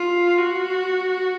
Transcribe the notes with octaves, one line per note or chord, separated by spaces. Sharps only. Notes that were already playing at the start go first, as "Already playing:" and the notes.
Already playing: F4
F#4